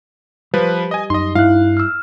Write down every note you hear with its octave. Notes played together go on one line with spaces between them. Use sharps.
F3 G3 B4
D#5 G#5
F#2 D#4 D#5 C6
G2 E4 F5 F#6
E6 F6